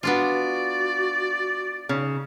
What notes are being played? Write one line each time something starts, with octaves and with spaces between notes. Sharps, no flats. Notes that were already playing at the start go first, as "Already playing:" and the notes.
B3 D4 F4 F#4 D5
C#3 D#4